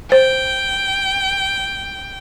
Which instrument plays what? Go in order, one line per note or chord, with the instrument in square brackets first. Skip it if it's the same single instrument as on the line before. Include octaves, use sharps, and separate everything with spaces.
[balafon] C5 [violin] G5